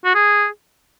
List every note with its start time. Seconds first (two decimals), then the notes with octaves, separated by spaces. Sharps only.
0.05 F#4
0.15 G#4